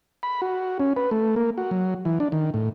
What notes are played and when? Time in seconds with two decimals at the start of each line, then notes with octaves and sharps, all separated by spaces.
0.23 B5
0.42 F#4
0.80 C#4
0.96 B4
1.11 A3
1.36 A#3
1.58 F#4
1.71 F#3
2.05 E3
2.20 D4
2.32 D#3
2.54 A2